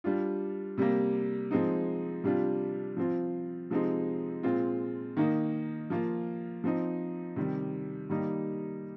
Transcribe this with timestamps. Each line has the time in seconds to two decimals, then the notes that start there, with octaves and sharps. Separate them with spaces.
0.04 G3 D4 F4
0.78 C3 G3 A#3
1.51 F3 G#3 C4 D#4
2.24 C3 G3 D4 F4
2.97 F3 C4 F4
3.70 C3 F3 G#3 C4 D#4
4.43 A#2 G#3 C4 F4
5.17 D#3 A#3 D#4
5.90 F3 A#3 F4
6.64 F3 C4 D#4
7.36 C3 D#3 G3
8.09 D#3 G3 A#3 D#4